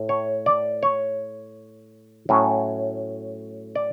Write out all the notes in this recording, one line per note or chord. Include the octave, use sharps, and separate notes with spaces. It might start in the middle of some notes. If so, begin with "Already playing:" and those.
Already playing: A2
C#5
D5
C#5
A2 F#3 C#4
D5